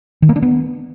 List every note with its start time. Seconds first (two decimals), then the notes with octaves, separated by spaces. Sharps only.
0.22 D#3
0.29 A#3
0.36 D4
0.42 B3